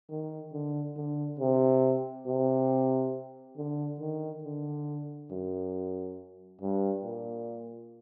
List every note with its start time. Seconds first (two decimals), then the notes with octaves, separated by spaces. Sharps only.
0.10 D#3
0.53 D3
0.96 D3
1.39 C3
2.27 C3
3.57 D3
4.00 D#3
4.44 D3
5.31 F#2
6.61 G2
7.04 A#2